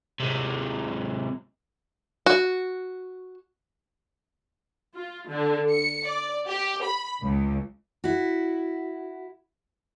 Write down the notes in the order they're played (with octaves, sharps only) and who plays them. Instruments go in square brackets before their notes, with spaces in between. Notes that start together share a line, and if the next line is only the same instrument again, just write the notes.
[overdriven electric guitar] C3 G#3
[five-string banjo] F#4
[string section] F4
D3
C#7
D5
G4
B5
C#2
[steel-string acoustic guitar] E4 F#4